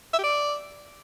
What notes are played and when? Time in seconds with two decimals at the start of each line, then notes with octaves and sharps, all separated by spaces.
0.13 E5
0.18 G4
0.23 D5